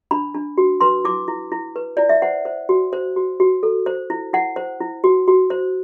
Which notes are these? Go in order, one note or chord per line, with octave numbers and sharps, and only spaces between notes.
D4 B5
D4
F#4
B4 C6
E4 D6
E4
E4
B4
E4 D5
E5
C5 F#5
C5
F#4
C5
F#4
F#4
A4
C5
E4
E4 F#5
C5
E4
F#4
F#4
C5